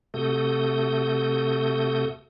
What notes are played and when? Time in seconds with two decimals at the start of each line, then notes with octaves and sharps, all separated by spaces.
0.14 C3 A3 F#4 A4 D#6 G6